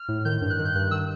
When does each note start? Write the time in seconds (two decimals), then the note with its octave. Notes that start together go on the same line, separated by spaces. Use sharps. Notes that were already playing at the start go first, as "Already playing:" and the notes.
Already playing: F6
0.08 A2
0.25 D#3 G6
0.41 G2
0.50 F#6
0.59 D#3
0.65 G6
0.75 G2 F#6
0.91 D#3 E6